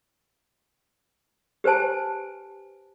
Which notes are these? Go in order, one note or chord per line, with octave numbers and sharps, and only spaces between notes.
G4 B4 C5 G#5 A5